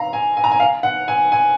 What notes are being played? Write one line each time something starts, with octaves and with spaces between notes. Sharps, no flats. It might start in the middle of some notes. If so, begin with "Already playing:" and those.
Already playing: F5 A#5
G#5
G#5
A#5
G#5
F5
F#5
G#5
G#5